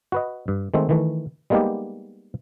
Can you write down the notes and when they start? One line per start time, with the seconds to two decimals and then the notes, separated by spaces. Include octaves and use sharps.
0.12 F#4 B4 D#5
0.48 G2
0.74 D#3 G#3 A3 C4
0.89 D#3 E3 A3
1.50 G3 G#3 A#3 B3 D#4 G4